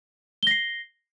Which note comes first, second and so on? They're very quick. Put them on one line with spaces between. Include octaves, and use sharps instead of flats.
G7 A#6 C7